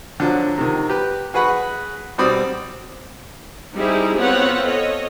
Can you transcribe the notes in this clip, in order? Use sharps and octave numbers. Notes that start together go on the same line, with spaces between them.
D3 F3 F#3
C3 D#3
G4 B4
F#4 G#4 B4 F#5 B5 C#6
B2 G3 C4 D5 D#6
G3 C4 D#4 E4 G4 G#4
B3 C4 F4 B4 C#5 F#5
A4 C#5 D#5